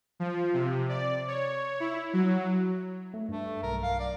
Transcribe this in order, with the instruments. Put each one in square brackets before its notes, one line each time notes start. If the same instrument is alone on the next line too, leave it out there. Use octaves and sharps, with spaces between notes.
[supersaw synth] F3
C3
D5
C#5
E4
F#3
[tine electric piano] A3
[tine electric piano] G2 [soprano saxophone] A3
[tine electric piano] B1 [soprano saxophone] A#4
[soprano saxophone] F5
D5